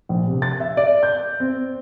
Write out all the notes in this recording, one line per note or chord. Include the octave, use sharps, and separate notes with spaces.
A#1
C3
A6
E5
D5
G6
C4